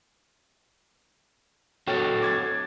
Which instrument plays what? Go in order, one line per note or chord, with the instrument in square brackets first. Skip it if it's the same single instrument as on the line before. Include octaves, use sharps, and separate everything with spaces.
[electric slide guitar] F#4 A4 C#5 [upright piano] G5 A6
[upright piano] D6 G#6 A6